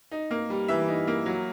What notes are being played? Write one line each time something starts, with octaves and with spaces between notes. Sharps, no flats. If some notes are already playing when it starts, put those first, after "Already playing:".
D#4
A#3
G3
E3 E5
D#4
A#3
F#3